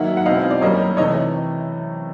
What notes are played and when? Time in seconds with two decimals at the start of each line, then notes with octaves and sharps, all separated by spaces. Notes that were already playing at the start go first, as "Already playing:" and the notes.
Already playing: G#2 D#3 F#3 A#3 E5 F#5
0.17 F#5
0.26 B2 G#3 C4 E4 D#5 F5
0.50 D5
0.61 F#2 D#3 G3 A#3 C#5 D#5
0.97 C3 E3 A3 C#5 D#5